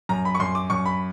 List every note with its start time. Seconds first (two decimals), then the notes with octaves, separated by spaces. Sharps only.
0.09 F#2 A#5
0.25 B5
0.35 C#6
0.40 F#2 C6
0.55 D6
0.70 F#2 C#6
0.86 B5